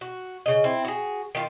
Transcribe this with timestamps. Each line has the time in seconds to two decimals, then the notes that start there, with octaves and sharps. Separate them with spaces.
0.01 F#4
0.46 C#3 D#5
0.64 C4 E4
0.85 F#4 G#4
1.35 D#3 F4